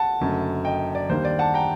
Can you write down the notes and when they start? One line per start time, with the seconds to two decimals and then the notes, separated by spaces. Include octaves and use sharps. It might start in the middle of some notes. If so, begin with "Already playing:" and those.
Already playing: F#5 A5
0.20 F#1 F#2 D3 A3
0.65 D#5 G5
0.95 D5
1.09 D#2 D#3 G3 A#3 D4 C5
1.25 D5
1.39 F#5 A5
1.54 G5 A#5